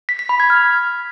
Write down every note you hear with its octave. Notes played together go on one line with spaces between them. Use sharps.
B6
B6
B5
G#6
F6